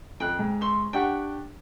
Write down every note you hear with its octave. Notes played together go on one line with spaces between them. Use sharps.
F2 G5 F#6
G#2
E5 C6 C#6
D4 G4 F#5 G5 C#6